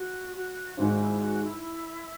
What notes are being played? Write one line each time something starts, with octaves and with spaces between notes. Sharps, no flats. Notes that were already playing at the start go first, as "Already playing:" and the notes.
Already playing: F#4
F#4
G#1 G#2 G#3 F#4
E4
F#4
E4